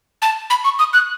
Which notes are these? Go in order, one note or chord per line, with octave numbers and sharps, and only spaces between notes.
A5
B5
C#6
D#6
F#6